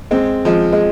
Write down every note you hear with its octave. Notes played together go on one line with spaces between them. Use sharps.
G#3 C4
F3 G#3
G#3